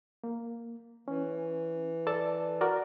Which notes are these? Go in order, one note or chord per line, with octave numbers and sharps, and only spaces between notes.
A#3
E3 C#4
A4 D5 A5
F#4 A#4 D5